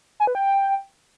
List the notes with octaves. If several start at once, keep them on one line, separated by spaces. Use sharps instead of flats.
G#5
B4
G5